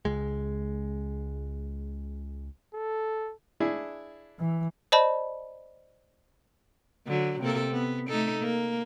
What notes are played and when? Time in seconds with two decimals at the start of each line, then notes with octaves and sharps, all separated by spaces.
0.05 C#2 G#3
2.74 A4
3.60 D4 E4 G#4
4.39 E3
4.92 C5 D5 D#5 A5 B5
7.07 D3 F#3
7.41 C3 A#3 A4
7.72 B3
8.08 A3 D#4 A4
8.40 A#3